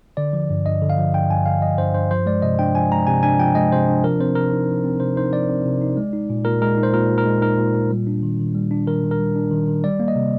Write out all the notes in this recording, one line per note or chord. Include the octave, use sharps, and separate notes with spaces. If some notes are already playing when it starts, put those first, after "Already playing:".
D3 D5
F3
G2
G2 D#5
D3
F5
F3
G2 G5
G2 G#5
D3 F5
F3 D#5
G2 C5
G2 C5
F3 C5
G#3 D5
C3 D#5
D4 G5
F3 G#5
G#3 A#5
C3 G#5
D4 G#5
F3 G5
G#3 D#5
C3 C5
D4
F3 A#4
C4 C5
C3 A#4
D#4
F3
C4
C3 C5
D#4 C5
F3 D5
C4
C3
D#4
G#3
D#4
A#2
A#2 A#4
G#3 A#4
D#4
C5
A#2 A#4
A#2
A#4
G#3
D#4 A#4
A#2
A#2
G3
D4
D#3
D#3
G3
D4
D#3 A#4
D#3
A#4
G3
D4
D#3
D#3
G3 D5
A#3
D#5
C3